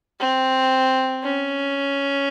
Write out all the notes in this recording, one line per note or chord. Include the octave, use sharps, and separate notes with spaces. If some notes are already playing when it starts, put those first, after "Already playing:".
C4
C#4